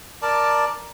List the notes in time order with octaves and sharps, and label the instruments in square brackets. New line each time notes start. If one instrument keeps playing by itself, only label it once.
[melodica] A#4 D5 A5